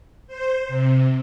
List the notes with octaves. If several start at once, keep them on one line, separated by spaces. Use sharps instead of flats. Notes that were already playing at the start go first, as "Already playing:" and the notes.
C5
C3